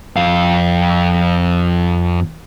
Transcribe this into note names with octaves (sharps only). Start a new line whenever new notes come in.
F2 F5